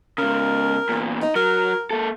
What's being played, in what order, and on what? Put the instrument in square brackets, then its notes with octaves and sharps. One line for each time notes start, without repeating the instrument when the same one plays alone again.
[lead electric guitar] G#2 C#3 [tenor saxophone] A#4
[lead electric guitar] E2 A#2
[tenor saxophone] D#4
[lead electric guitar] F#3 [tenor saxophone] A#4
[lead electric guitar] A#3 A4